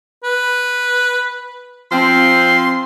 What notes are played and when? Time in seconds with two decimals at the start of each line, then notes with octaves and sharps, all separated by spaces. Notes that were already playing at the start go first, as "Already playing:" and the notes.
0.24 B4
1.92 F3 C4 C6